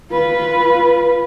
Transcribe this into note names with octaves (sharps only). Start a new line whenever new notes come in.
F4 B4